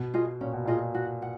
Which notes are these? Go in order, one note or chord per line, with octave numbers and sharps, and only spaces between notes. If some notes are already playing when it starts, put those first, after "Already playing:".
Already playing: B2
F4 G#4 D#5
A#2 C#4
B2
A#2 F4 G#4 D#5
F#4
F#5